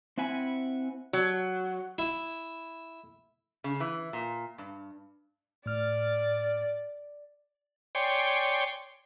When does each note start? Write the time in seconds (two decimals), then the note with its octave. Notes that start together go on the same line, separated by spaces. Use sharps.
0.18 C4 E4 F#5 G#5 B5
1.13 F#3
1.98 E4
3.64 C#3
3.80 E3
4.13 A#2
4.58 G2
5.66 A2 D5 F6
7.95 C#5 D5 G5 G#5 C6